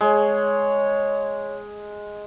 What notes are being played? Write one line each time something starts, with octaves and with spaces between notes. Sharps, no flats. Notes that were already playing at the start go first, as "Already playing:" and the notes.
G#3 C#5